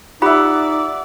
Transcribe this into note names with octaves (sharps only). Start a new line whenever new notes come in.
D#4 F4 G4 D5 E5 F#5 B5